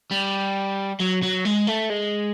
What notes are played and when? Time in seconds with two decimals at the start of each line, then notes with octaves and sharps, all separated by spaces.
0.11 G3
1.00 F#3
1.23 F#3
1.45 G#3
1.67 A3
1.90 G#3